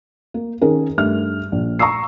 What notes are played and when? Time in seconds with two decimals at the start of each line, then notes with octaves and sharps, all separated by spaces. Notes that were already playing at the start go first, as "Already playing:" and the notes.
0.34 A#3
0.61 D#3 C#4 G#4 A#4
0.97 G2 A3 F6
1.52 A#1
1.79 A#5 C#6 D#6 E6 C7